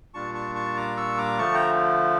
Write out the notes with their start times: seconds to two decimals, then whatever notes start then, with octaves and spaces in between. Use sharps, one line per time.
0.14 A#2 G3 D4 F4 A5 C#6
0.35 A5 C#6
0.55 A5 C#6
0.77 A#5 D6
0.97 C#6 E6
1.18 A#5 D6
1.38 D3 F3 A3 A5 C#6
1.54 G5 A#5